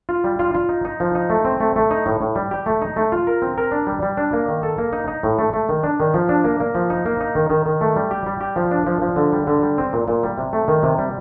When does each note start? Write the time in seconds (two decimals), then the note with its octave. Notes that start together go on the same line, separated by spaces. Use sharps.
0.09 F4
0.24 G3
0.39 F4
0.55 F4
0.69 D#4
0.85 D#4
1.00 F3
1.15 D#4
1.30 A3
1.45 C4
1.60 A3
1.76 A3
1.91 D#4
2.06 A2
2.21 A2
2.36 G3
2.51 G4
2.66 A3
2.82 D#4
2.96 A3
3.12 F4
3.27 A#4
3.42 C4
3.58 A#4
3.72 D4
3.87 G3
4.02 G3
4.17 D4
4.33 A#3
4.48 D#3
4.63 A4
4.78 A#3
4.93 D#4
5.08 D#4
5.23 A2
5.38 A3
5.53 A3
5.69 D#3
5.83 D4
6.00 D#3
6.14 F3
6.29 D4
6.44 A#3
6.60 A#3
6.75 F3
6.90 D#4
7.06 A#3
7.20 D#4
7.35 D#3
7.50 D#3
7.66 D#3
7.81 A3
7.96 G3
8.11 G4
8.26 G3
8.41 G4
8.56 F3
8.71 D4
8.87 F3
9.02 F3
9.16 D3
9.33 G3
9.47 D3
9.62 G3
9.78 C4
9.93 A#2
10.08 A#2
10.23 G3
10.38 C3
10.53 A3
10.68 D#3
10.83 C3
10.98 G3